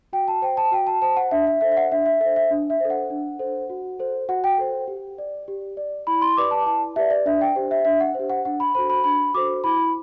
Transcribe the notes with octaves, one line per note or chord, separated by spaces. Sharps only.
F#4 G5
A5
C5 G5
A5
F#4 G5
A5
C5 A5
F#5
D4 E5
E5
A4 C5 E5
E5
F#5
D4 E5
E5
A4 C5 E5
E5
D4
E5
A4 C5
F#5
D4
A4 C5
F#4
A4 C5
F#4 F#5
G5
A4 C5
G4
D5
G4
D5
E4 B5
C6
G4 B4 D5 D6
A5
E4 A5
G4 B4 D5 E5
D5
D4 E5
G5
G4 C5
E5
D4 E5
F#5
G4 C5
F#5
D4 F#5
B5
F#4 A4 C5 B5
B5
D4 B5
F#4 A4 C5 D6
E4 B5